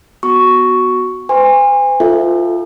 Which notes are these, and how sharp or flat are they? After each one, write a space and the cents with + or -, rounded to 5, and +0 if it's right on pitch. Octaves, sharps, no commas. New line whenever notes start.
B3 +0 F#4 +0 C#6 +5
C5 -45 G#5 -35 C6 +10
F4 +0 A4 +0 E5 +0